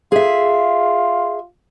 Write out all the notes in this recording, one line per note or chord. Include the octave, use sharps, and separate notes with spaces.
F4 G#4 E5